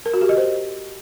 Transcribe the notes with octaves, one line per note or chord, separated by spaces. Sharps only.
A#4
F#4
G4
D#5
C5